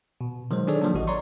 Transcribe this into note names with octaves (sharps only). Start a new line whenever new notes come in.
B2
D#3 F#3 G#3 C5
D4 D#4 G#4 A4 C#5 D5
D#3 F3 F#3 A#3 D4
A1 F#4 D#5
C#5 D5 A#5 C6 C#6